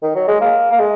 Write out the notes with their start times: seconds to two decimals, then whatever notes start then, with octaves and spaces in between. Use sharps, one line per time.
0.03 D#3
0.15 F#3
0.28 G#3
0.41 A#3
0.72 A#3
0.79 G#3